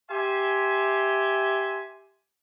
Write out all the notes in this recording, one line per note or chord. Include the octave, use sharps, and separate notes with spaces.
G4 E5 G#5 C6